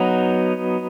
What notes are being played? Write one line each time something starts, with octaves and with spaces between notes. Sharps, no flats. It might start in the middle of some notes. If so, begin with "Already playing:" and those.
Already playing: F#3 B3 D#4